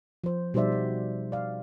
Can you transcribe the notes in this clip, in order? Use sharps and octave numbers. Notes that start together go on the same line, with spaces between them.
F3 C5
B2 G3 D#4 C5 D5 E5
F#4
D5 F5